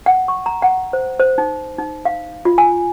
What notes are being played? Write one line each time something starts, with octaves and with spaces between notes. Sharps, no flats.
F#5
C#6
A#5
F#5
C5
C5
D#4
D#4
F5
F4
G#5